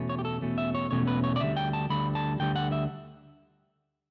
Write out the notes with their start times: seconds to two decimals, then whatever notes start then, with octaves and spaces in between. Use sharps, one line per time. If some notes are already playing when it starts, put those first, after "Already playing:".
Already playing: E2 B2 A3 C#4
0.09 C#5
0.19 G4
0.25 A4
0.41 E2 B2 A3 C#4
0.58 E5
0.75 C#5
0.91 E2 B2 A3 C#4 C#5
1.07 B4
1.24 C#5
1.36 D5
1.40 D2 D3 G3 E5
1.57 G5
1.73 A5
1.90 D2 D3 G3 B5
2.15 A5
2.40 D2 D3 G3 G5
2.56 F#5
2.72 E5